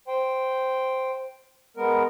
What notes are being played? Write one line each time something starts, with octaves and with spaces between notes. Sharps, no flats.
C5 G5
G#3 B3 A#4